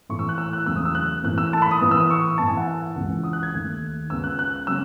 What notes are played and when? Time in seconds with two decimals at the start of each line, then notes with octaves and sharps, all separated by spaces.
0.09 A2 E3 A3 C#6
0.19 E6
0.29 F#6
0.38 E6
0.53 F#6
0.66 E2 C#3 F#3 A3 E6
0.76 D#6
0.85 E6
0.95 F#6
1.23 A2 E3 A3 F#6
1.38 E6
1.53 A5
1.62 B5
1.71 D#6
1.81 A2 E3 B3 D#6
1.91 E6
2.00 D#6
2.10 C#6
2.38 A2 E3 B3 A5
2.48 G#5
2.57 F#5
2.68 F#5
2.96 C#2 C#3 E3 G#3
3.24 D#6
3.33 F#6
3.43 G#6
3.53 D#2 D#3 A3
4.10 C#2 C#3 G#3 B3 E6
4.24 F#6
4.39 F#6
4.67 C#3 F#3 E6